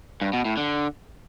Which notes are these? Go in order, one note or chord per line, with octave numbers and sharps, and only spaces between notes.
G2
B2
A2
D3